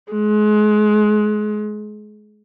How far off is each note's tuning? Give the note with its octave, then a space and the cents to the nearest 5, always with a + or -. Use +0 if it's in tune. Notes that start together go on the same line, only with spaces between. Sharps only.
G#3 +30